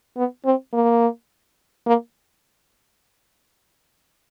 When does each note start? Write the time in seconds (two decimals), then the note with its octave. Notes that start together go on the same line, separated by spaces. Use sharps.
0.17 B3
0.45 C4
0.73 A#3
1.86 A#3